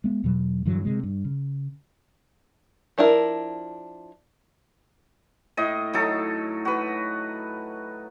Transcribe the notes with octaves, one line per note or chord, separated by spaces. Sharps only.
G#3 B3
E2 B2 F#3
G2 D3 E3 F#3
C3 G#3
G2
C#3
F3 D4 E4 A#4
A2 D#5
F#3 D#4 A4
F#4 B4